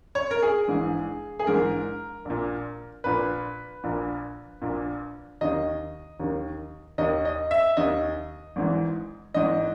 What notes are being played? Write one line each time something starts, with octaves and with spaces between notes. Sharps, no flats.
C#5
A#4
G#4
A#1 G#2 E3
G#4
A#1 G#2 E3 A#4
A#1 A#2
A#1 A#2 B4
A#1 A#2
A#1 A#2
D#2 D#3 D#5
D#2 D#3
D#2 D#3 D#5
D#5
E5
D#2 D#3 D#5
G#1 G#2 E3
G#1 G#2 E3 D#5